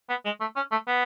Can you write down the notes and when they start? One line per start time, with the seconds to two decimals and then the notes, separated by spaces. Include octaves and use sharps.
0.10 B3
0.25 G#3
0.41 A3
0.56 C#4
0.72 A3
0.87 B3